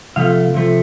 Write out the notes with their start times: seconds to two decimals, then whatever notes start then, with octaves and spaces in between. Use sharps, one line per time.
0.16 C3 F3 A3 F5
0.54 C3 F3 A3